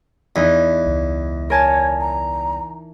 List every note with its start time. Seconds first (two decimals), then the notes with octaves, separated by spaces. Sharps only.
0.36 E2 E3 D#4
0.86 C#2
1.50 A#4 C#5 G#5 A5
2.01 A#5